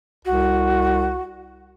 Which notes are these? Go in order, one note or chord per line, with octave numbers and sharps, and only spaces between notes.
C2 F#4